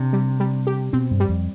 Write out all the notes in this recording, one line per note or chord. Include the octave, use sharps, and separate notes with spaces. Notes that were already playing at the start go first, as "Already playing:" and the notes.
Already playing: C3 D4
G3
G3
G4
B2 C4
G2
G3
F2